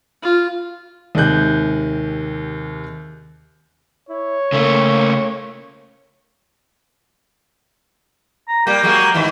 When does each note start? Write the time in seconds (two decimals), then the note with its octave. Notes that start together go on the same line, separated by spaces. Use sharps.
0.22 F4
1.15 D#2 C3 G#3 F#6 G6
4.09 E4 C#5
4.52 C#3 A3 A#3
8.48 A#5
8.67 G3 A#3 G4
8.83 F#3 G#3 A#3
9.14 G#2 D#3 E3